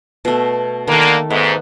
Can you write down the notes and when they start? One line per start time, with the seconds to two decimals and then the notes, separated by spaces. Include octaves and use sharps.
0.25 B2 A3
0.88 D3 D#3 A3 A#3
1.30 D2 G#2 B3